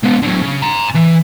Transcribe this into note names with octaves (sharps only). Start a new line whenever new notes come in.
G#3 B3
D3 F#3
C#3
G#5 A#5
E3